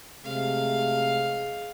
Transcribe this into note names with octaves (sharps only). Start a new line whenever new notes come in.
C3 G#3 A3 F5